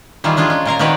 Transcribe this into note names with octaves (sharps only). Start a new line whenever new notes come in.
D#3 E3 G3 F4 G#4
G#3 D4 F4 G#4
C#4
A#2 A#4 F5 A#5
D#3 C4 F#4 B4 C#5 D5